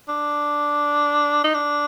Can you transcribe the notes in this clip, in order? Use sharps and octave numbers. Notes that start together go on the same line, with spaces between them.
D4
D#4
D4